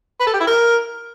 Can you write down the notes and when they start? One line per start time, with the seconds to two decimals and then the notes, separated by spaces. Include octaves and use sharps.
0.20 B4
0.27 A4
0.34 G4
0.40 E4
0.47 A#4